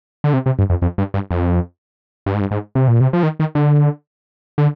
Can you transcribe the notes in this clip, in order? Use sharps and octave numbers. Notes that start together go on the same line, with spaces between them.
D3
C3
C3
G2
F2
F2
G2
G2
F2
G2
G#2
G2
G#2
C3
A#2
C3
F3
D#3
D#3
D3
D3